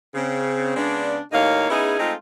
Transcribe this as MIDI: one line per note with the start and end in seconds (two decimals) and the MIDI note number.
0.15 0.74 49
0.15 0.74 60
0.76 1.19 49
0.76 1.19 56
0.76 1.19 59
0.76 1.19 62
1.32 1.70 39
1.32 1.70 45
1.32 1.70 58
1.32 1.70 63
1.32 1.70 73
1.32 1.70 77
1.70 1.98 59
1.70 1.98 61
1.70 1.98 63
1.70 1.98 64
1.70 1.98 68
1.99 2.14 56
1.99 2.14 57
1.99 2.14 60
1.99 2.14 63
1.99 2.14 65